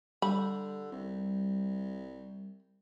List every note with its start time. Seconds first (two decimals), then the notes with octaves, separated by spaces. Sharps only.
0.22 D3 G3 B5
0.92 C2